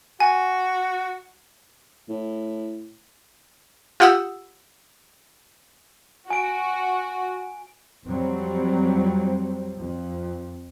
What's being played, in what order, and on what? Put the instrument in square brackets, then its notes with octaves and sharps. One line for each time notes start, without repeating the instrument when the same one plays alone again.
[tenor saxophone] F#4 [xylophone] G#5
[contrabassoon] A2
[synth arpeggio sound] F4 G4 F#5 D#6 E6
[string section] F#4 [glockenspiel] G#5 D7
[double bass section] F2 F#3 G3 C4
F2